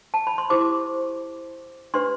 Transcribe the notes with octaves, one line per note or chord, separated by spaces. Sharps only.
A5
B5
C6
E4 G4 C5 D6
D4 G4 B4 C6